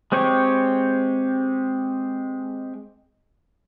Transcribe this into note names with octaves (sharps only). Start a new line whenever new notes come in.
G#3 C4 G4 C#5